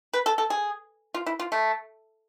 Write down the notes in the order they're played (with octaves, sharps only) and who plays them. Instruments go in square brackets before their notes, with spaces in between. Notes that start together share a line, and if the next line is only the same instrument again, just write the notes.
[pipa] B4
A4
A4
G#4
F4
E4
F4
A3